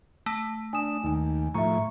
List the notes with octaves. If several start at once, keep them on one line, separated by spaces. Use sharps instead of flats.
A3
D4 G#5 D#6 E7
D#2 D#4 G#5
A2 F3 E5 A#5 C#6